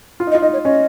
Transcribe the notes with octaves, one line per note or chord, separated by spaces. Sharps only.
F4
D#4
D#5
F4
D#4 D#5
C#5
C#4 D#5